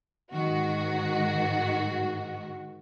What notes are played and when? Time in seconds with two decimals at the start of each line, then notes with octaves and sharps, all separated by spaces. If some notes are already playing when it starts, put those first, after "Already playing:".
0.32 G#2 D#3 F#4